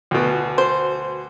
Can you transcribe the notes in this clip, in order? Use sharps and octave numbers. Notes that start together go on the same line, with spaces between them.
D2 B2
C5